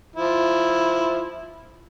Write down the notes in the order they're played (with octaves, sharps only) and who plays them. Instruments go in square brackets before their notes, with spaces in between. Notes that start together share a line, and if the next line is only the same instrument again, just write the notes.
[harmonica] F3 E4